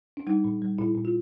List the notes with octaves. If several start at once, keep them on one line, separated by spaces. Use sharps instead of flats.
D4
G3 D#4
A#2
G3
A#2 E4
A#2
F4